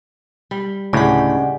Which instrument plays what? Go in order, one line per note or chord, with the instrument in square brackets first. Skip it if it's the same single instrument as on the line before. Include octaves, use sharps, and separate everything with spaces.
[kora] G3
[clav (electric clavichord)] D2 A2 [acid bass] C#3 [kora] G#3 G4 [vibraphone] D5 F#5